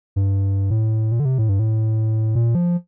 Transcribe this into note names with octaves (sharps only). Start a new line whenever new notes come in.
G2
A2
A#2
D3
C3
A2
G2
A2
A#2
F3